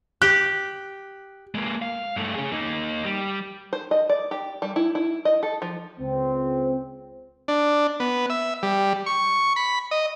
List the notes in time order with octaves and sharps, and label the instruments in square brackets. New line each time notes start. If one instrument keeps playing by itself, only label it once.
[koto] G4 [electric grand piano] F#6
[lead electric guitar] G#3 A#3
F5
G2 A3
C#4 G#4
A#3 D#4
G3
[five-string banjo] C5
D#5
D5
G4
G3
E4
E4
D#5
A4
F3
[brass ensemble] C#2 C4
[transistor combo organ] D4
B3
E5
G3
C#6
B5
D#5